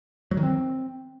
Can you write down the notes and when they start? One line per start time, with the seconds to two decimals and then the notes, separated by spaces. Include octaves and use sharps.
0.31 F#3
0.37 D#3
0.43 C4